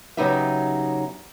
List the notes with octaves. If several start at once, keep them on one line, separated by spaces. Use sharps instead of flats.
C#3 F#3 B3 D#4 G4 E5